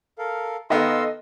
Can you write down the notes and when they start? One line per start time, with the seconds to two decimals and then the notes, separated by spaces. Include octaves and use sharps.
0.18 A4 A#4 F5
0.70 D#3 B3 A4 D#5 F5 C6 E6